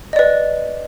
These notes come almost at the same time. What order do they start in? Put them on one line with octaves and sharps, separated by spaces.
D#5 D5 B4